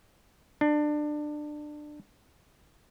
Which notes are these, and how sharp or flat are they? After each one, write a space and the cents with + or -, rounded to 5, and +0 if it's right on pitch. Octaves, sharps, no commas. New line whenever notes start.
D4 +25